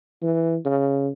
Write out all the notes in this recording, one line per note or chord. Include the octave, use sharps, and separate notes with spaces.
E3
C#3